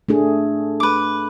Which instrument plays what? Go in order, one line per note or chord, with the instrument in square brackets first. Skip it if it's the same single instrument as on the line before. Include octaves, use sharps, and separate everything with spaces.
[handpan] A3 D4 G#4
[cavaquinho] B4 D6